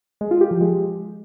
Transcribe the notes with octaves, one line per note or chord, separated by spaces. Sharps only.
G#3
F4
G4
F3
G#3